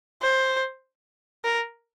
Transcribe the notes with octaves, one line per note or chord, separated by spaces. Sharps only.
C5
A#4